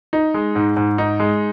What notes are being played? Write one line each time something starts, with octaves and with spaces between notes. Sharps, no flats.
D#4
G#3
G#2
G#2
D#4
G#3